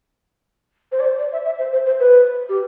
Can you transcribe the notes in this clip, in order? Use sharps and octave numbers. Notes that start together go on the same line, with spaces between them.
C5
D5
C5
D5
E5
E5
C5
C5
C5
B4
G4